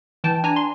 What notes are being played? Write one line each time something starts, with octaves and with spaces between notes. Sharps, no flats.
E3 G5 A5
D4 G#5 A#5
C6